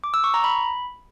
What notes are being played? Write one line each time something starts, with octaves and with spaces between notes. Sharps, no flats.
D6
E6
C#6
A#5
B5